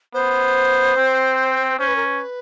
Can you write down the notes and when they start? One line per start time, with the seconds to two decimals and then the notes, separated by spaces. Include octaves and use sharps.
0.14 B3 C5
0.96 C4
1.79 C#4 C5
1.88 B4
1.96 A#4
2.05 B4